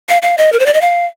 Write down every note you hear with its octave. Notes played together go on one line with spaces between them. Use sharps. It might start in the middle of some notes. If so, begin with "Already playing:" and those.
F5
F5
D#5
A#4
C5
D5
D#5
F5